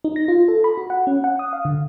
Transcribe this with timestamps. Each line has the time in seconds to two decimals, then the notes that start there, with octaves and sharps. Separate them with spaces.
0.04 D#4
0.16 A#6
0.28 F4
0.48 A4
0.64 B5
0.77 F#4
0.90 F#5
1.07 C#4
1.24 F#5
1.39 D#6
1.53 F5
1.65 D3